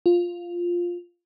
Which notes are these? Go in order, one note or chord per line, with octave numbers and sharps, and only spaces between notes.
F4